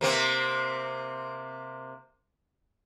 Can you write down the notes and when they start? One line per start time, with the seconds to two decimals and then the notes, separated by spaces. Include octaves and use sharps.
0.01 C3 A#3 C4